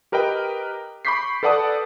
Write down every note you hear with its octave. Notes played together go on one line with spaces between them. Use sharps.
G4 A#4 B4 D#5 G5
B5 C#6 D6 G6 B6 C7
A4 B4 D5 F#5 A5 D#6